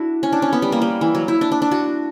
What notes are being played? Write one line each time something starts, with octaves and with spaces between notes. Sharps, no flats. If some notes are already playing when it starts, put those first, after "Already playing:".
Already playing: D4 E4 F#4
C#4
D4
C#4
B3
G3
A#3
G3
E3
F#3
E4
D4
D4
D4
F#4